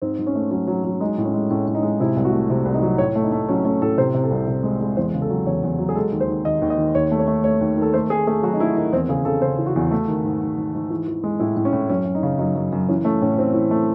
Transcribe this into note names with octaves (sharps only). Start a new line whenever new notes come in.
G#2 C4
G#2
C#4
A3
F#3 C#4
F#3
F#3
G#3 D#4
A2
C#4
G#3
A2 C#4
A2
D#4
G#3
C3 E4
C2
F#4
A3
C3 E4
C2
D#4
F#3
A2 C#5
A3
D#4
A3
F#3 C#4
A3 C#4
A2 A4
C3 C5
C3
A4
C2
C3
G#3
G#3
E2 C5
C#3
A4
F#3
E2 C#5
E2
F#3
G#4
G#3 A4
D#2
C5
D#3
D#2 D#5
D#2
D#5
D#3
D#2 C#5
A3
C#5
A3
A3 C#5
D#2
D#3
A4
A3 C5
A3 G#4
A3 G#4
F#3 F#4
D#4
A3 E4
D#3 D#4
E2 C4
C#3 G#4
C#3 A4
C#3 C5
E3
F#4
E2
A3
D#3
G#2
G#2
G#2
G#2
E3
E3
G#3
A2 E4
A2
C#4
A2
F#2 C#4
F#2
D#4
C#3
F#2 D#4
F#2
F#2
E3 C#4
A3 C#4
A2 C#4
E3 C4
E3
A3